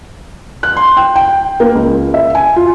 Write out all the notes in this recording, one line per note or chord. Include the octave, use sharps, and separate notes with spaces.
F#6
C6
G5
G5
A#3
C#2
E5
G#5
F4